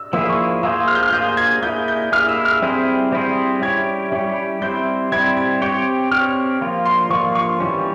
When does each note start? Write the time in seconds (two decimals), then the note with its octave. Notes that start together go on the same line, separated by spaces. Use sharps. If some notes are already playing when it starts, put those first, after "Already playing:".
Already playing: E6
0.13 F3 A#3 E4 G#4 E6
0.29 C#6
0.63 A#3 F4 G#4 C5 E6
0.88 F6
0.95 G6
1.03 F6
1.13 A#3 F4 G#4 C5 G6
1.37 G#6
1.62 A#3 E4 G#4 G6
1.88 G6
2.12 A#3 E4 G#4 F6
2.29 E6
2.45 F6
2.62 G3 C4 E4 G#4 C5
3.12 G3 C4 E4 G#4 C5
3.62 G3 C#4 E4 G4 C#5 G#6
4.12 G3 C#4 E4 G4 C#5
4.62 G3 C4 E4 G6
5.12 G3 C4 E4 G#6
5.37 G#6
5.62 C4 G4 C#5 G6
6.11 C4 G4 C#5 F6
6.61 F3 A#3 F4
6.85 C6
7.10 F3 A#3 F4 C#6
7.35 C#6
7.60 E3 G3 C#4